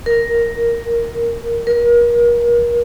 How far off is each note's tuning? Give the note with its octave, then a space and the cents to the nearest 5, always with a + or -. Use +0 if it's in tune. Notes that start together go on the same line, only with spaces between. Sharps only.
A#4 +5
A#4 +35